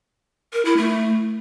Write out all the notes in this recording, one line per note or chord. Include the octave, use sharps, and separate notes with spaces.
A#4
E4
A3